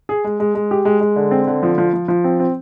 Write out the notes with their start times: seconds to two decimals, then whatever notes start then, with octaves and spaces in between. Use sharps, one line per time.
0.09 G#4
0.24 G#3
0.40 G#3
0.55 G#3
0.71 G4
0.85 G#3
1.01 G#3
1.16 D3
1.31 C4
1.47 D3
1.63 F3
1.78 F3
1.93 F3
2.08 F3
2.24 C4
2.40 C4